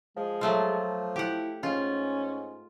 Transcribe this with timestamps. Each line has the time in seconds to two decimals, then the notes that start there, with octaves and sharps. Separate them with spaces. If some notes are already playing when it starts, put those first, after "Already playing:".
0.17 F3 G#3
0.41 F#3 A3 F4
1.16 E4 G4 F#5
1.63 G#2 C#4 F4